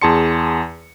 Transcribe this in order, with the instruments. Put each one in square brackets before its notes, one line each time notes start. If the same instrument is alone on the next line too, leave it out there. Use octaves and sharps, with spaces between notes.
[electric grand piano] E2 G#4 A5 C6 C#7